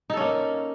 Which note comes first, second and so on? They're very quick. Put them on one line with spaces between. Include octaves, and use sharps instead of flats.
D#4 A4 C#4 A#3